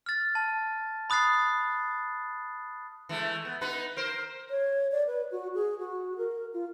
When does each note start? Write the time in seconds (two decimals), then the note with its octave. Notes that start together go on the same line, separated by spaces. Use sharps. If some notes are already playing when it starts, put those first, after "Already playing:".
0.06 F6 A6
0.35 A5
1.10 B5 D#6 F#6 A6 C7
3.09 E3 G#3 A3
3.45 B3
3.61 B3 D#4 B4
3.97 A#4 C5
4.50 C#5
4.92 D5
5.07 B4
5.32 F#4
5.55 G#4
5.79 F#4
6.18 A#4
6.54 F4